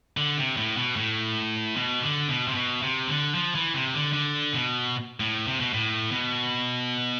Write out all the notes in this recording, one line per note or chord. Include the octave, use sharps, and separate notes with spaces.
D3
C3
A2
B2
A2
B2
D3
B2
C3
B2
C3
D3
F3
E3
C3
D3
D3
B2
A2
C3
B2
A2
B2